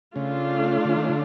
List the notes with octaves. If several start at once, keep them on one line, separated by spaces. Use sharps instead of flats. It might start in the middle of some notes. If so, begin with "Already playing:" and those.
C#3 A3 D4 F4
D3
D#3
D3